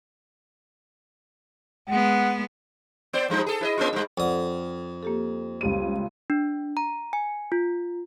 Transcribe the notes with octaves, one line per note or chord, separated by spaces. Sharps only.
G#3 B3 F#5
B3 C5 D5
F3 G3 D#4
G#4 A4
E4 B4 D#5
A#3 C#4 F4
G#2 G3
F2 A4 D5 F#5 D#6
A#3 G4 A4
C#2 G3 D#7
D4
A#5
G#5
F4